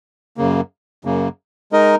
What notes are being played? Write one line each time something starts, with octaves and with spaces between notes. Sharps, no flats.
F#2 C#3 A#3
F#2 C#3 A#3
G#3 D#4 A#4 D#5